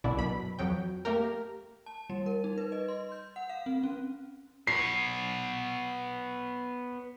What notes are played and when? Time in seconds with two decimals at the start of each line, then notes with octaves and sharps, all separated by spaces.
0.04 C2 B2 D4 E4
0.17 F#2 B2 B5
0.59 F2 F#3 G5
1.05 A3 A#3 G4 A#4
1.86 A5
2.10 G3
2.26 A#4
2.44 D#4
2.58 B4
2.72 D#5
2.88 C6
3.12 G6
3.36 F#5
3.49 F5
3.66 C4
3.84 C#4
4.67 B3 C#5 C7